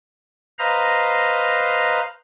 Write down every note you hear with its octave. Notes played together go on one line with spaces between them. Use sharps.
B4 C5 D#5 F5 A#5